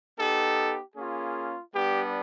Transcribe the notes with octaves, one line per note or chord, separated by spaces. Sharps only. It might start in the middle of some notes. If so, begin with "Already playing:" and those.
B3 D#4 G4 A4
A#3 C#4 F4 G#4
G3 B3 D4 G4